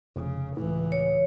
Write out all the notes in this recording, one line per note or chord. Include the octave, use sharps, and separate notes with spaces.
F1 C#3
C#2 A2 E3
C#5